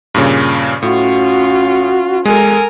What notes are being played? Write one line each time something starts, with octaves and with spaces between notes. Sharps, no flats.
G2 A#2 C#3
A2 C#4 F4 F#4
G#3 A4 A#4 G#5